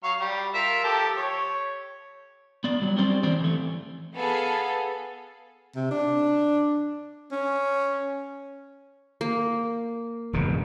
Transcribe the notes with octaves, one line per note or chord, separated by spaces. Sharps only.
F#3 F5 C#6
G3
F4 A#4 E5
F3 G4 A4
C#5
B3 D5
F#3 G3
C4 C#4 G4 C5 D5
E3 C4 C5 D5
E3 A3
B3 G#4 A4 F5
C3
D4
C#4
A#3
E1 G2 C#3